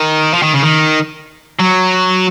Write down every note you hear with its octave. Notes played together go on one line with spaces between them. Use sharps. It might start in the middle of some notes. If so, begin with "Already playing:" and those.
Already playing: D#3
F3
D#3
C#3
D#3
F#3